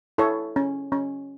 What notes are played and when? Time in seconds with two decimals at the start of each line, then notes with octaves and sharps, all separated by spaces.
0.18 E4 A4 C#5
0.56 C#4
0.92 C#4